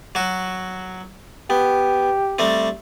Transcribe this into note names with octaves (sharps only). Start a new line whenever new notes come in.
F#3 F#4
B3 G4
G3 A3 C4